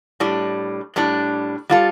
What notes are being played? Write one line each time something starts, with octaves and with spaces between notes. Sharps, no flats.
A2 G3 D4
A2 G3 D4
G3 F4 A4